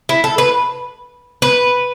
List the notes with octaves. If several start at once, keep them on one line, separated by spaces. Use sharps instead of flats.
E4
A4
B4
B4